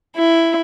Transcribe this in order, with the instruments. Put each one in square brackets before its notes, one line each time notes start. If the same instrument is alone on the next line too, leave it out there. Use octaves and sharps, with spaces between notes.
[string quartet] E4